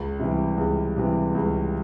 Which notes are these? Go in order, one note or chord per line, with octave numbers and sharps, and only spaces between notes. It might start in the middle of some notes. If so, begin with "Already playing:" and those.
Already playing: C#2
C3 E3 G3
C#2
C3 E3 G3
C#2